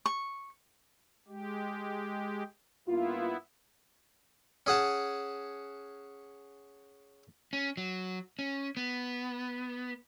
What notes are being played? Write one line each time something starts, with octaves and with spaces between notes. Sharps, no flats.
C#6
G#3 G4
G2 A#3 B3 E4 F4
C#4 G#4 F#5 A5
C#4
F#3
C#4
B3